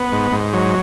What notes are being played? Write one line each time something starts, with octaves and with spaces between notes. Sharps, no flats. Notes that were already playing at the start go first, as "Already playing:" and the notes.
Already playing: B3
G#2
G#2
F#3